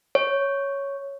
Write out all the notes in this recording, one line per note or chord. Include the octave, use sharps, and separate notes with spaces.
C#5